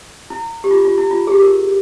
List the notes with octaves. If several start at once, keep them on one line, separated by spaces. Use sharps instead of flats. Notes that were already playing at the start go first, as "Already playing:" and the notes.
E4
G4
F4
F4
E4
F4
G#4
G4
A#4